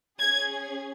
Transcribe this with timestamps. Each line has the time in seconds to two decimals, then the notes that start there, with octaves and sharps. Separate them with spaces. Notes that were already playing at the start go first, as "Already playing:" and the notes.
0.19 C#4 G#4 G#6